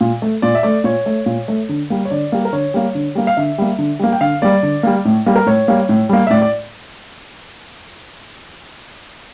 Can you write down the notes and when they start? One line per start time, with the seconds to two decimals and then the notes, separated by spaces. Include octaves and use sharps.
0.01 A#2
0.22 A3
0.42 A#2 D5
0.55 E5
0.63 A3 D5
0.84 A#2 C#5
1.06 A3
1.26 A#2
1.48 A3
1.69 D3
1.90 G3 A#3
2.05 C#5
2.11 D3 D5
2.32 G3 A#3
2.45 A#4
2.53 D3 C#5
2.74 G3 A#3
2.95 D3
3.15 G3 A#3
3.27 F5
3.37 D3 E5
3.58 G3 A#3
3.79 D3
3.99 G3 A#3
4.12 G5
4.21 D3 F5
4.42 G3 A#3 D5
4.63 D3
4.83 G3 A#3
5.05 A2
5.26 G3 A#3
5.36 A#4
5.46 A2 C#5
5.68 G3 A#3
5.89 A2
6.09 G3 A#3
6.27 E5
6.30 A2 D5
6.42 D5